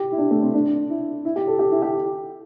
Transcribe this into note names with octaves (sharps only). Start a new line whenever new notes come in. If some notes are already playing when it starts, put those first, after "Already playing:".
Already playing: G4
E4
D4
A3
C4
D4
E4
E4
G4
A4
G4
E4
G4